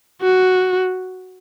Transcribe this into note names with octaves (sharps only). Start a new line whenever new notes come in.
F#4